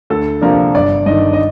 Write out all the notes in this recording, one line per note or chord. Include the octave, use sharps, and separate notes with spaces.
D2 A4
C3 F3 A#3 D4 A#4
G1 D5
G2 D#3 D#5
D#5